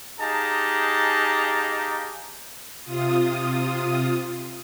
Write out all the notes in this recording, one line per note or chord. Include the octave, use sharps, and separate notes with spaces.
D#4 G4 G#4 F5 A5 A#5
C3 F4 D#6